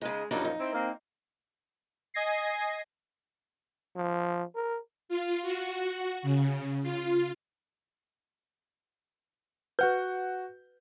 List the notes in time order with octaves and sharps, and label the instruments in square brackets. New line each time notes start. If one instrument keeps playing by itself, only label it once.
[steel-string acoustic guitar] C#3 D#4 [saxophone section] G#3
[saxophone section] F#2 A#2 F3 [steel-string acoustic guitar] G3 D4 D#4
[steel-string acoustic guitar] D#4
[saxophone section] C4 E4
A#3 C4
[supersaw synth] D#5 G#5 A#6 C7
[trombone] F3
A#4
[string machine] F4
F#4
C#3
F4
[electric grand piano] F#4 F#5 G6 [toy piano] B4